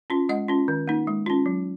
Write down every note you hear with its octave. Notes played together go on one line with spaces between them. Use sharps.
C#4 F4
G#3 D#5 F#5
C#4 F4
D#3
A#3 D#4
G#3
C#4 F4
F#3